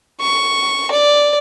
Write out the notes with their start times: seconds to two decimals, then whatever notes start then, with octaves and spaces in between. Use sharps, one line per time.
0.21 C#6
0.91 D5